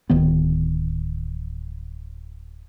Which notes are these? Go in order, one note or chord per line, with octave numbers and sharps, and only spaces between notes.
D1 D#3 B3